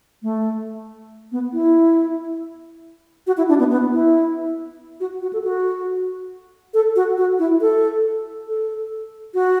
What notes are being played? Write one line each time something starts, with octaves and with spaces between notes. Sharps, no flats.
A3
B3
E4
F#4
E4
D4
B3
B3
E4
F#4
F#4
A4
F#4
A4
F#4
F#4
E4
A4
A4
F#4